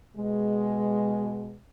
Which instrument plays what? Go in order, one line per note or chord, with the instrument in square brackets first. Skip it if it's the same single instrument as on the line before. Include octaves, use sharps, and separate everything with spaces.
[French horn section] B2 G#3